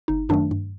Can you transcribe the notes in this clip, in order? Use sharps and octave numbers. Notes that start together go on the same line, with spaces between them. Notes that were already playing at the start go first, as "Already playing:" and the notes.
G1 D#4
F#2 D#3 F#3 A3 D4
G2